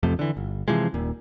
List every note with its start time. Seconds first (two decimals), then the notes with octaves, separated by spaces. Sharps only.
0.03 A1 F2 C3 A3
0.19 D3 E3
0.37 G1
0.68 C3 E3 F3 G#3
0.94 D#1 A#2